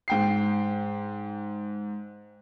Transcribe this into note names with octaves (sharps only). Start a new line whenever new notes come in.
G#2 G5 C7